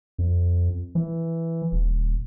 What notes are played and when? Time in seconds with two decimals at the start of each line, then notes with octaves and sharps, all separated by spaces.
0.18 F2
0.95 E3
1.72 D#1